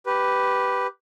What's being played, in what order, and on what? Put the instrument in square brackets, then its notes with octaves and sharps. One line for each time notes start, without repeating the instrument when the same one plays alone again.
[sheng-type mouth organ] G4 B4